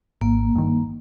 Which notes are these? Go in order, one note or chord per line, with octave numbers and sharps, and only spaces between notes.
G#1 A#3
G2 D#3